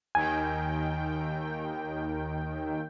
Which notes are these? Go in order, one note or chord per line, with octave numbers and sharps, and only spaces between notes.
D#2 D#3 G5 G#5